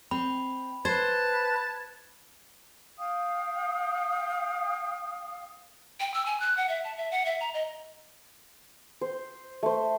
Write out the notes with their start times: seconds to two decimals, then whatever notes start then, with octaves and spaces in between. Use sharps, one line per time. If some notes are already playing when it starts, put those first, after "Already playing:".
0.11 C4 B5
0.85 B4 C5 A5 G#6
2.99 F5 G5 D#6
6.00 G5
6.14 E6
6.26 G#5
6.40 F#6
6.57 F#5
6.69 E5
6.84 A5
6.98 E5
7.11 F#5
7.26 E5
7.41 A#5
7.54 D#5
9.01 C5
9.63 A3 C5